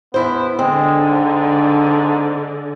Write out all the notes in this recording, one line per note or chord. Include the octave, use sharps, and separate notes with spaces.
E2 B3 E4 C5
D3 G#3 C4
G#2